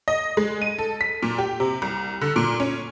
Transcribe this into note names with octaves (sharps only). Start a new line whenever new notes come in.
D#5
G#3
D#7
A4
B6
A#2
G4
C3
C2
D3
A#2
C#4